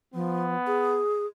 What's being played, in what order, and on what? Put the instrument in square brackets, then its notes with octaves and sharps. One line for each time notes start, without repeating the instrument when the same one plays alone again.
[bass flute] F3 [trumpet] B3
[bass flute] G#4